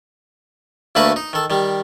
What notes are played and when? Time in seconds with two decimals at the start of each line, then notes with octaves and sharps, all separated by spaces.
0.95 D2 A3 A#3 F#4 B4 F#5
1.16 D#4
1.33 D#3 A4
1.50 D#3 G3